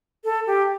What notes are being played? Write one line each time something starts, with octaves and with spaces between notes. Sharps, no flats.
A4
G4